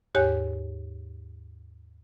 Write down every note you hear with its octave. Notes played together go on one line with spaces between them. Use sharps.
D#2 G#2 G4 C#5 G#5 F#6